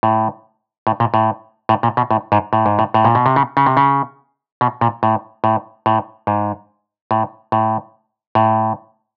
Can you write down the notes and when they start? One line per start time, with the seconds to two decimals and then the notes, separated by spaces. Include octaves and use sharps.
0.03 A2
0.87 A2
1.00 A#2
1.14 A2
1.69 A2
1.83 A#2
1.97 B2
2.11 A2
2.32 G#2
2.53 A2
2.66 G#2
2.79 A2
2.94 A2
3.05 A#2
3.15 B2
3.26 C3
3.36 C#3
3.57 C#3
3.66 C3
3.77 C#3
4.61 B2
4.81 A#2
5.03 A2
5.44 A2
5.86 A2
6.27 G#2
7.11 A2
7.52 A2
8.35 A2